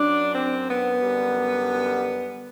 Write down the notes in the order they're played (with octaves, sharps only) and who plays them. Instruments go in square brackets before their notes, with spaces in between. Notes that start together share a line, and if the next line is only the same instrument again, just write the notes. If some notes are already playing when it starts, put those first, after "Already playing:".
Already playing: [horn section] F#2 F#3 D4
C4
B3
F#2 D3 G3